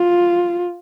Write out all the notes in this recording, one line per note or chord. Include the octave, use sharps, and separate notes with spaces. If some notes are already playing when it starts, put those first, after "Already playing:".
Already playing: F4